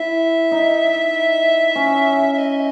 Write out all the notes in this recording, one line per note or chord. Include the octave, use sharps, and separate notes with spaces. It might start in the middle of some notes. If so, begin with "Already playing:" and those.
Already playing: E4 E5
D#4
C#4
E5
D#5